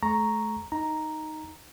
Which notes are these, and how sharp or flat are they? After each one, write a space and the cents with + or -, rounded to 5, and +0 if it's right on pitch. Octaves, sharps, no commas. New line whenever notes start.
A3 -35 A#5 +0 C#6 -5
D#4 +0 A#5 +0